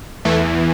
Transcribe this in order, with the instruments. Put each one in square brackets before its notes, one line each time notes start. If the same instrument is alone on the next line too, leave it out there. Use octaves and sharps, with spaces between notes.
[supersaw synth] E2 E3 A3